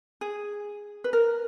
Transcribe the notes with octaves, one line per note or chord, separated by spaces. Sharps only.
G#4
B4
A#4